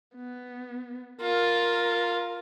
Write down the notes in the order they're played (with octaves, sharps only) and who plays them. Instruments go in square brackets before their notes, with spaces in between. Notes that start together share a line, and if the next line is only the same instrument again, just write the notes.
[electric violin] B3
[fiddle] F4 [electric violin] A#4